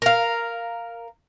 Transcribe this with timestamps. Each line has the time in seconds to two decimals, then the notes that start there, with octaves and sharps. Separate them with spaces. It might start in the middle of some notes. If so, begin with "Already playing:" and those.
0.02 A#4 F5